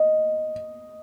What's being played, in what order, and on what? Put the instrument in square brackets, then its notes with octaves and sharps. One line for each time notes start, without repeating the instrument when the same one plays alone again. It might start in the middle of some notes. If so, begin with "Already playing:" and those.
Already playing: [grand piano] D#5